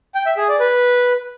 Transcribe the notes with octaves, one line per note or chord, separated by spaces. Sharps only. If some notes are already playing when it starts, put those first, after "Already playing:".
G5
E5
G#4
D5
B4